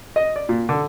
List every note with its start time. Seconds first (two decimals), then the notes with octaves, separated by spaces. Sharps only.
0.16 D#5
0.36 D5
0.49 A#2
0.69 D3